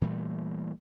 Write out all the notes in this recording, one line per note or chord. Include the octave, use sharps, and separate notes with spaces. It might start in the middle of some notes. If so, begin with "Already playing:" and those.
A#2 E3 G3 A3